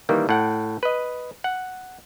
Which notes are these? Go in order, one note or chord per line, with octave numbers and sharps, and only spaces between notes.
D#3 E3 G3 A#3
A2 F#5 G5
B4 D#5
F#5